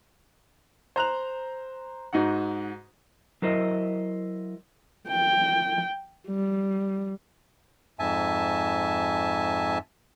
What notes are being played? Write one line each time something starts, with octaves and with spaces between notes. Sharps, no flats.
C5 A#5 F#6 F7
G#2 D#4 F#4 F#5
F#3 E4 A#4 C5 D#5
G5
G3
F2 G#2 E5 G#5 A5